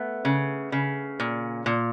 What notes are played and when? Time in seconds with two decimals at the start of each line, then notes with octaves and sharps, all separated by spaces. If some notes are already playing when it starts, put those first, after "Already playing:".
Already playing: A3 B3
0.25 C#3
0.72 C#3
1.20 A#2
1.66 A#2